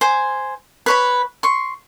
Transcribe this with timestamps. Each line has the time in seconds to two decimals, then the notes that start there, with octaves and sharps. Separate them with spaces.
0.01 C5 G#5
0.86 B4 C#5 B5
1.43 C6 C#6